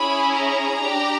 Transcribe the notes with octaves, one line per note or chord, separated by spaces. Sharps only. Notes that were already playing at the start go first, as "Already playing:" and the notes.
Already playing: C#4 E4 G#4 B5
A#5
D4 G4